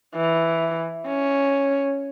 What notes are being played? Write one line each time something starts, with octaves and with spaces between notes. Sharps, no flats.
E3
C#4